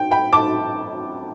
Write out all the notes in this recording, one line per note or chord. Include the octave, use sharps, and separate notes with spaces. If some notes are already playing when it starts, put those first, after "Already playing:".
Already playing: G5
G5 B5
A5 D6